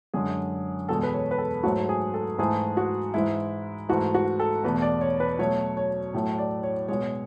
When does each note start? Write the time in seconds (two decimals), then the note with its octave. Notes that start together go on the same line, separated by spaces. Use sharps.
0.14 F#2 D3 G#3 G#4
0.88 E2 B2 G#3 A4
1.03 B4
1.14 C#5
1.31 B4
1.38 A4
1.63 G#2 F#3 A3 F#4
1.89 G#4
2.14 A4
2.38 G#2 E3 A3 G#4
2.77 F#4
3.14 G#2 E3 G#3 E4
3.89 G#2 E3 A3 F#4
4.14 F#4
4.40 A4
4.63 E2 B2 A3 B4
4.82 D5
5.01 C#5
5.20 B4
5.39 B2 F#3 A3 C#5
5.77 C#5
6.14 A2 F#3 A3
6.38 D5
6.63 C#5
6.88 B2 G#3 C#5